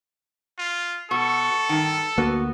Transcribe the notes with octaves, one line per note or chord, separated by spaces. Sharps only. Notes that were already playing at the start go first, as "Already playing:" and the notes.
F4
B2 A4 C#6
G2 D#3
D2 A#3 B3 F#4